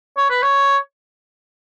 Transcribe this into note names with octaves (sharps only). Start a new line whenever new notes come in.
C#5
B4
C#5